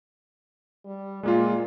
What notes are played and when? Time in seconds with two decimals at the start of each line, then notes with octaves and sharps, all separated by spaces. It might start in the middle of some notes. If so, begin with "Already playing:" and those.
0.85 G3
1.23 A#2 G#3 A#3 F4